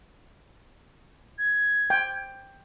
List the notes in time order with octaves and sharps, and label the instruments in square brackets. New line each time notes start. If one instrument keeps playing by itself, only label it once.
[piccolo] G#6
[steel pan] G5